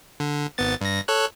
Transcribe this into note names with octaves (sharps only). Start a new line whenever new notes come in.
D3
G#1 B3 A6
G2 A#6
A4 C#5 F#6